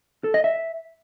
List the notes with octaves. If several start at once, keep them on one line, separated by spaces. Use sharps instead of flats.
A4
D#5
E5